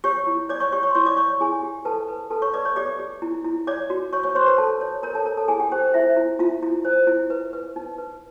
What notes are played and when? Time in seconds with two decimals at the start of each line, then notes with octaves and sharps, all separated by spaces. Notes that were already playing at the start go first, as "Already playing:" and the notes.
0.04 G4 C#5 C#6
0.27 E4
0.49 C#5 D5 D6
0.60 C#5 C#6
0.72 G4 C#5 C#6
0.83 C#5 C#6
0.91 C6
0.95 E4 C#5 C#6
1.06 D5 D6
1.17 C#5 C#6
1.41 E4 G#4 G#5
1.62 G4
1.85 A4 B4 A5
2.09 B4
2.30 A4 B4 A5
2.42 C#5 C#6
2.53 B4 D5 D6
2.65 C#5 C#6
2.76 G4 D5 D6
2.99 G4
3.22 E4
3.44 E4
3.67 C#5 D5 D6
3.90 F#4
4.13 C#5 C#6
4.23 C#5 C#6
4.35 C5 C#5 C6
4.46 B4 B5
4.58 A4 A5
4.81 C#5
5.03 A#4 C#5 A#5
5.15 A4 A5
5.26 A#4 C#5 A#5
5.37 A4 A5
5.48 E4 G#4 G#5
5.60 G4 G5
5.72 G4 C5 G5
5.94 E4 C5 E5
6.17 E4
6.39 E4 F4 F5
6.63 E4
6.85 C5
7.07 E4
7.30 B4
7.53 B4
7.76 D#4
7.98 B4